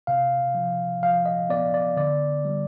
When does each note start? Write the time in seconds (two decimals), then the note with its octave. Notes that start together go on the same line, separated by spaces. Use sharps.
0.07 C3 F5
0.55 F3
1.03 F3 F5
1.26 D#5
1.49 B3 D5
1.74 D5
1.97 D3 D5
2.45 G3